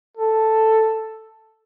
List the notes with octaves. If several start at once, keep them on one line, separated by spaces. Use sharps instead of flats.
A4